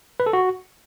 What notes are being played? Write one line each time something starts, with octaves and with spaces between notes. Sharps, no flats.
B4
A4
F#4